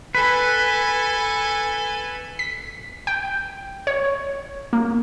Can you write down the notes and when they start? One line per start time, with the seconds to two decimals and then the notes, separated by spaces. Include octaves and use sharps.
0.15 A4 B4 G#5
2.39 B6
3.07 G5
3.87 C#5
4.73 A#3